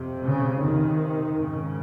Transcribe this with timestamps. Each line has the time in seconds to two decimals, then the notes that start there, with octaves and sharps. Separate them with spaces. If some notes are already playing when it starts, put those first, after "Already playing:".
Already playing: F2 C3
0.23 C#3
0.61 F2 C3 D#3
1.38 G#2 C#3